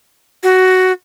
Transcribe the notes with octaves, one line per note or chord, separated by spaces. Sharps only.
F#4